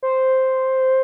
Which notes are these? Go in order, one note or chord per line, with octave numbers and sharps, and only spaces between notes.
C5